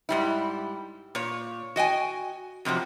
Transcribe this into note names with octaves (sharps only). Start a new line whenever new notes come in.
G#2 G3 E4
A#2 C#5
F#4 D#5 G5 G#5
F2 C3 F3 F#3